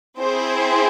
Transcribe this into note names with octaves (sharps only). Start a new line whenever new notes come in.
C4 E4 G#4 C5